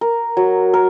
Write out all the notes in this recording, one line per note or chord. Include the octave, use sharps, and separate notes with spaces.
A#4
F#3
A#4